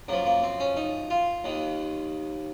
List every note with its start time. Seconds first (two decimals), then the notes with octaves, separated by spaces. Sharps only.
0.08 F#2 F3 A#3
0.26 A#3
0.43 C4
0.60 C#4
0.76 D#4
1.10 F4
1.44 D#2 D#3